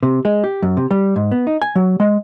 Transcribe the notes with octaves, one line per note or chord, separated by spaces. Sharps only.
C3
G#3
G4
F#2
C3
G3
G#2
B3
D#4
G#5
F#3
G#3